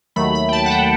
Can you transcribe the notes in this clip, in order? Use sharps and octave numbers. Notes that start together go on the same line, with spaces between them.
D#2 D#3 F#3 A3 B5
B5
G5
A5
F#5
G5